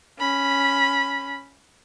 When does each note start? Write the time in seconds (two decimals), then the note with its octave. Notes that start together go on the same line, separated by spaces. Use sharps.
0.19 C#4 B5